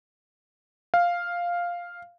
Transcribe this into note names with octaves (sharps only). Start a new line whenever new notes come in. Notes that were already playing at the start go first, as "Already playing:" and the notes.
F5